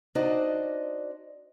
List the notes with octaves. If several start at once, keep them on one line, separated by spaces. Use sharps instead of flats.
D4 D#4 F#4 C5 D5 D#5